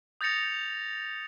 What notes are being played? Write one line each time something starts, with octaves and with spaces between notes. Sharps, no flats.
D#6 G6 A6 A#6 C#7 F7